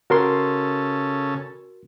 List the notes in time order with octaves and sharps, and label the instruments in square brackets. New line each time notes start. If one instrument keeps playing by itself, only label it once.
[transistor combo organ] C#3 A4 [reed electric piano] F#4 A#4 C6